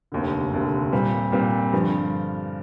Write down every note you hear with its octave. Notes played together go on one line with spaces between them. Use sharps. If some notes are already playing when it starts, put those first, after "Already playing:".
F1 D#2 D3
F1 D#2 D3
A#2 G3 C4
A#2 G3 C4
G2 D3 F3